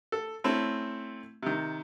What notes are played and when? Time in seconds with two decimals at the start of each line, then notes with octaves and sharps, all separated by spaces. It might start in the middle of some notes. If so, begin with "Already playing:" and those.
0.12 A4
0.44 A3 C4 C#4 E4
1.42 C3 D#3